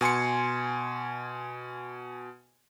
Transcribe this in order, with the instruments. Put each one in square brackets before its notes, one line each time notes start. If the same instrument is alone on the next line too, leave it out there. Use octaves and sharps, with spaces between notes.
[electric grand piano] B2 G#5 C6 C#7